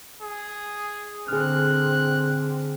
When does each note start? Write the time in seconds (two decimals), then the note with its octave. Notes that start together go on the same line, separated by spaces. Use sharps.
0.22 G#4
1.28 D3 C4 G#4 F6 F#6